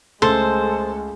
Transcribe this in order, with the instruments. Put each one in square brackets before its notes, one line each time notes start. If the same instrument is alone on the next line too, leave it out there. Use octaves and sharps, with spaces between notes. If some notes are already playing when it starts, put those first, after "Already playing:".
[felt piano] C#2 A3 [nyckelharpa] G#3 [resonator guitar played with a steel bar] A4 [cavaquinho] C5